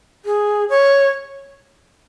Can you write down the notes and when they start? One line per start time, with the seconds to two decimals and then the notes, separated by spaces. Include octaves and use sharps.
0.25 G#4
0.69 C#5